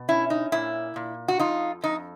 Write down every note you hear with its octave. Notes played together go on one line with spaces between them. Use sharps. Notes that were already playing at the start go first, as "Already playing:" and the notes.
Already playing: B2
C#4 E4
D#4
A#2 E4
A#2
F#4
F2 D#4 F4
F2 D#4